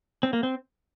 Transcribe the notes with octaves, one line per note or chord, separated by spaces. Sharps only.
C4
A#3
C4